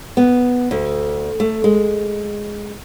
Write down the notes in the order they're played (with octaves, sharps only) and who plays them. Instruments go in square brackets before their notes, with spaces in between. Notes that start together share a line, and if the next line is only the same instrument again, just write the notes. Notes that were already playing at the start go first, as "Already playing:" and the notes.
[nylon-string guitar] B3
D2
A3
G#3